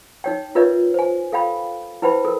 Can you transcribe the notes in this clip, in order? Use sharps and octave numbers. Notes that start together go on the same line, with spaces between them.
D#4 C#5 G5
F4 A#4 B4 C#5 D5 E5
C5 G#5
A4 F5 G5 B5
E4 B4 C5 G5 B5
A4 A#4